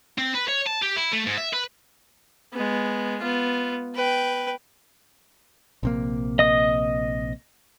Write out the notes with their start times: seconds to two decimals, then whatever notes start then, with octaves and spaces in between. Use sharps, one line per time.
0.18 C4
0.34 B4
0.48 C#5
0.66 A5
0.82 G4
0.96 E4
1.13 A3
1.27 G#2
1.38 E5
1.54 B4
2.53 G#3 B3
3.21 B3 F4
3.95 B4 G5
5.83 A#1 C3 A#3
6.39 D#5 D#6